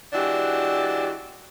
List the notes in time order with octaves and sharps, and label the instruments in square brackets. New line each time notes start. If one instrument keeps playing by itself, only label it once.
[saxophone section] E3 G#3 D4 F#4 G4